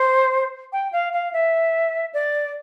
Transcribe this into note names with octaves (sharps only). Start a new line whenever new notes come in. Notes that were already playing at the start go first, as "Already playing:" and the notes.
Already playing: C5
G5
F5
F5
E5
D5